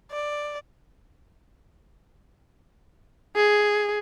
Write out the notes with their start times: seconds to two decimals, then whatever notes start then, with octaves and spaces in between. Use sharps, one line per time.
0.12 D5
3.36 G#4